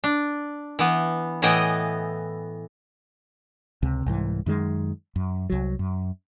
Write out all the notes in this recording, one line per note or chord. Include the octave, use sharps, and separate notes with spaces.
D4
E3 B3
A2 E3 B3 D#5 G5 G#5
C#2 C3
C2 G#2 E3
F#2 D#3 F#3 G#3
F#2
C2 F#3
F#2